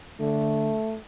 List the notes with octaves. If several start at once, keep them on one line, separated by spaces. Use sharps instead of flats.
D3 A3